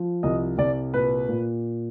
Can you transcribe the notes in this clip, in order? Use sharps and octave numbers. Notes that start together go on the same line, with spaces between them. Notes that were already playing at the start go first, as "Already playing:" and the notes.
Already playing: F3
C2 D#5
C2 D5
A#2 B4
A#2